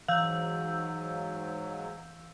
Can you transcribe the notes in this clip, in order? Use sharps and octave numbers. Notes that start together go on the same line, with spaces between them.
G#2 E3 F#3 F5 E6 G6